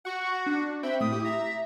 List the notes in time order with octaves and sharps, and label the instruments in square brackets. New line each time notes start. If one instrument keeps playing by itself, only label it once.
[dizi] F#4 [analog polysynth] F#5 C#6
[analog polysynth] D4
[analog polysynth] C4 G5 B5 [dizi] E5
[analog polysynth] A2 [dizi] D#6
[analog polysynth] E4 G4
[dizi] E5 [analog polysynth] A#5